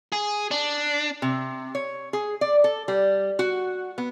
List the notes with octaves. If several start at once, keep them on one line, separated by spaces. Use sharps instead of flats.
G#4
D4
C3
C#5
G#4
D5
A4
G3
F#4
B3